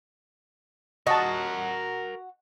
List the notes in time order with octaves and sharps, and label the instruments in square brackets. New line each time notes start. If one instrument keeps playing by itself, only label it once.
[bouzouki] F#4 [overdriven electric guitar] A#4 F#5 [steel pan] D#5 A5